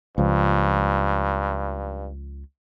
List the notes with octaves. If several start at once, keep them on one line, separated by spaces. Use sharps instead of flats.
C#2 G2 F3